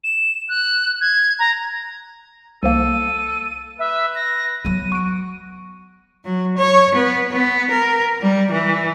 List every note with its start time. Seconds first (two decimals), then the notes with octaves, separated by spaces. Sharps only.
0.04 E7
0.49 F#6
1.01 G#6
1.39 A#5
2.63 C2 F3 A#3 A4 D#7
3.79 B4 E5
4.15 A#6
4.65 F#3 B3 D#7
4.92 F#4 C#6 D7
6.24 F#3
6.57 C#5
6.95 B3
7.31 B3
7.70 A#4
8.21 G3
8.51 E3